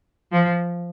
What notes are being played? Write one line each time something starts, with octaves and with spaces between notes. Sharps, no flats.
F3